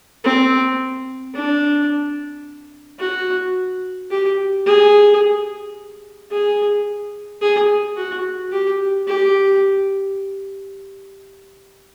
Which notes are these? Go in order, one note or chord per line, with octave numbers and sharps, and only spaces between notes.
C4
D4
F#4
G4
G#4
G#4
G#4
F#4
G4
G4